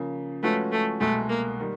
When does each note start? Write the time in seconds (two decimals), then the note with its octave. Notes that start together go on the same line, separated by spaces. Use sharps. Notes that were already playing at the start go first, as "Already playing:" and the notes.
Already playing: C#3 F3 A#3
0.43 F3 G#3 A3 C#4 F#4 B4
0.72 A3
1.00 C2 B2 G#3 A3
1.29 A#3
1.60 D#3 G3